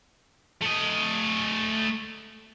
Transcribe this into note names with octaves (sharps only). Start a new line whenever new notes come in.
A3 D#5